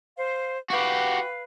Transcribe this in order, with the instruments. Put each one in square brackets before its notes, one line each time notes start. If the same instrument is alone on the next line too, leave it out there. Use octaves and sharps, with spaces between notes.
[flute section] C5 F5
[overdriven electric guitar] F#4 G4 [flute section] B4 F5